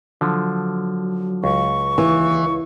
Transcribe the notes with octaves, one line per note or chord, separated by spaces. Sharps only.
D3 F3 F#3
C#2 C#6
D#2 E3